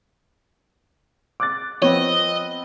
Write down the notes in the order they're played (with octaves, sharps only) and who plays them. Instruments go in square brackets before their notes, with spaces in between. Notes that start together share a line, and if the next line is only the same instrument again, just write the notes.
[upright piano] D6 F#6 A6
[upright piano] F3 B3 C4 [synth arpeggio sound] C#5 [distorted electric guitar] D#5